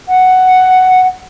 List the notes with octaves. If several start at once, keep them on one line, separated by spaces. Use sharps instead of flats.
F#5